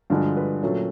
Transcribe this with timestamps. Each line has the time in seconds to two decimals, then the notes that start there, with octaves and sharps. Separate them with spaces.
0.10 G2 D3 F3 G#3 F#4
0.37 B4
0.62 A#2 F#3 A3 C#4